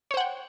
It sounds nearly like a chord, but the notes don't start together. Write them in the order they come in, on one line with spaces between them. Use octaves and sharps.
C#5 C5 F#5 G5